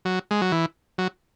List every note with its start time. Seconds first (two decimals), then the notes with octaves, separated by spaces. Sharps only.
0.05 F#3
0.31 G#3
0.42 F#3
0.52 E3
0.98 F#3